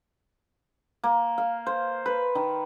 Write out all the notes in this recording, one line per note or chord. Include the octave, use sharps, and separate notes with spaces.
A#3
F5
C5
B4
D#3